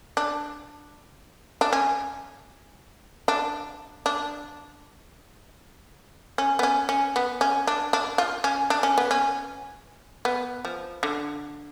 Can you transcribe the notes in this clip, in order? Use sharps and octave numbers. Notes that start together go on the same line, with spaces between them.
D4
D4
C#4
D4
D4
C#4
B3
C#4
C#4
B3
C#4
D4
D4
F4
C#4
D4
C#4
B3
C#4
B3
F3
D3